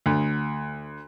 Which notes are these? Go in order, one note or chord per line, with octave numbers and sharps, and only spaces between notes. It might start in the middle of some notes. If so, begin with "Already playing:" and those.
D2